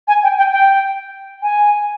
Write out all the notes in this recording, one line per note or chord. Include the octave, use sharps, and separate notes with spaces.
G#5
G5
G5
G5
G#5